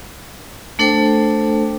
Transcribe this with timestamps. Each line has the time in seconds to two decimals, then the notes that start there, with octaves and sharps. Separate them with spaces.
0.79 A3 D4 A4 C5 G5